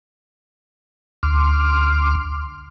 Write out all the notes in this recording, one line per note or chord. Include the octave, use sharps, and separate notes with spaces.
D2 C6 D6 F6